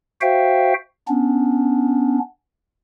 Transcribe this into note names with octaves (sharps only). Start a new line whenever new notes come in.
F#4 C5 E5 F5 G5
B3 C#4 D4